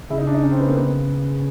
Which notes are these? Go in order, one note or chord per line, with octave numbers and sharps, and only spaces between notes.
C#3 E4
D#4
D4
D#4
C#4
C4
B3
A#3
B3